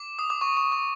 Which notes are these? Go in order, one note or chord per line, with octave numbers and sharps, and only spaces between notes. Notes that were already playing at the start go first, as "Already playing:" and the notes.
Already playing: D6
D#6
D6
C#6
C#6
C#6